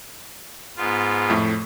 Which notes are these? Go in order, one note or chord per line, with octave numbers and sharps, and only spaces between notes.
G#2 B3 F4
F2 A2 A3